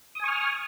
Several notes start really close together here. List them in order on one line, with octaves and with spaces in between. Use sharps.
D#6 G#5 C#6 F6